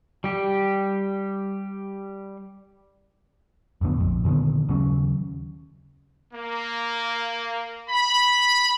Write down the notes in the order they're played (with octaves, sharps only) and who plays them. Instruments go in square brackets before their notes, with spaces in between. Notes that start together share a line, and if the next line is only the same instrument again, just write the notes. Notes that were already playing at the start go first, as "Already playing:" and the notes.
[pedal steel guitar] G3 G4
[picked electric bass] F2 A2 D3 B3
A#1 F2
A#2 D3 D#3 B3
D#2 C#3 F#3 C#4
[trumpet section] A#3
B5